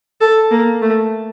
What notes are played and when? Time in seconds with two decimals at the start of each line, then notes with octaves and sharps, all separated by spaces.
0.21 A4
0.51 A#3
0.82 A3